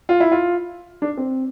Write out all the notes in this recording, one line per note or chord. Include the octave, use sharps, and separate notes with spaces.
F4
E4
F4
D4
C4